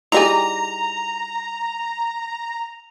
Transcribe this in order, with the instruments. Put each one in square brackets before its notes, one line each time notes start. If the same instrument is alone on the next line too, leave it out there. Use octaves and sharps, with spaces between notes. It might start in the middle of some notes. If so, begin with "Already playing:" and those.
[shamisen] D#3 G3 G#5 [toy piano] E4 G#4 [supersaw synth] A#5 [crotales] F7